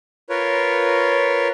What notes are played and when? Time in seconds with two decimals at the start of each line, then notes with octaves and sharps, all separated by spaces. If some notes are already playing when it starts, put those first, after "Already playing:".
0.30 F4 A#4 B4 C#5